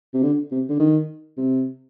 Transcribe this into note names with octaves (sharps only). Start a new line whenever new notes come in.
C3
D3
C3
D3
D#3
C3